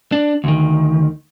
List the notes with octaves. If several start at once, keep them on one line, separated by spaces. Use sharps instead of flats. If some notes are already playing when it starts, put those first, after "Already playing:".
D4
D2 D#3